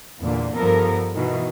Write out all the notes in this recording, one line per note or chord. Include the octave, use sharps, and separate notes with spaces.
E2 A#2 D3
G2 F3 B3 A4 A#4
B2 D#3 E3